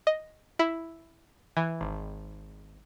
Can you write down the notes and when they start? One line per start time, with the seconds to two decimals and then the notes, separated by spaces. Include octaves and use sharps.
0.07 D#5
0.59 E4
1.57 E3
1.81 G#1